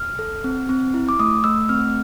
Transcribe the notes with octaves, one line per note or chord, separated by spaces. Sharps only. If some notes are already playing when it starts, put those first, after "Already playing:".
Already playing: F6
A4
C4
C4
E4
D6
A3 D#6
A3 E6
C4 F6